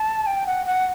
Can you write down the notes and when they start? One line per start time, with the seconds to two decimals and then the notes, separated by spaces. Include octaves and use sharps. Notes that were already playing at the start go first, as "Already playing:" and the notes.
Already playing: A5
0.26 G5
0.47 F#5
0.66 F#5